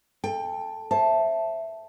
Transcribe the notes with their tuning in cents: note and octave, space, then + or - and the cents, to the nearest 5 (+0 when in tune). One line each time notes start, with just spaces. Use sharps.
A4 +0 G5 +25
C5 +35 E5 +0 A5 +0